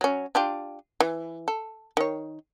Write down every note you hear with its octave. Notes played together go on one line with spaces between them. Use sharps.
F#3 C#4
D4 F4 G4
E3
A4
D#3 C#5